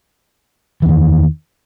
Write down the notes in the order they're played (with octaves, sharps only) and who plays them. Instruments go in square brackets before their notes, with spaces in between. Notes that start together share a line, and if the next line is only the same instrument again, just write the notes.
[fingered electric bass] E3
E2
D#3